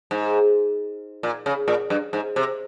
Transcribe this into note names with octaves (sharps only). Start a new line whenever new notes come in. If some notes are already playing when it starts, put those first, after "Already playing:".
G#2
A#2
C#3
A#2
G2
G#2
C3